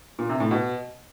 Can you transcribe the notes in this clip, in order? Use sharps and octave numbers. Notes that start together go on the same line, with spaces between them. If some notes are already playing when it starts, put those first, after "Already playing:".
A#2
C3
A2
B2